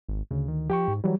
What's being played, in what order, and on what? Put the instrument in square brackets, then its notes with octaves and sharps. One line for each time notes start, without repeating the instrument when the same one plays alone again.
[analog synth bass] G#1
[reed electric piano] D2 [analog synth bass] C#3
[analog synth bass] D#3
[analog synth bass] F3 [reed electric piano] G4 G5 C#6
[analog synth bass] G#2
[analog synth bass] E3 [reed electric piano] F#3 G3